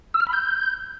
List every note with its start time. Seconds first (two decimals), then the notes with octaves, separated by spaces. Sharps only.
0.14 E6
0.20 F6
0.27 B5
0.33 G6